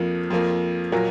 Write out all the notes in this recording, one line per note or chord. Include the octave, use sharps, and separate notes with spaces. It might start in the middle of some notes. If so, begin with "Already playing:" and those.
Already playing: F2 F3 A#3
F2 F3 A#3
A#2 F#3 A#3